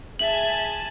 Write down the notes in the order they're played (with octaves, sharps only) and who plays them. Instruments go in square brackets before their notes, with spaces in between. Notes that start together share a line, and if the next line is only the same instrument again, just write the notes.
[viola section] G#4 G#5 A5 [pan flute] E5 [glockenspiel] F#7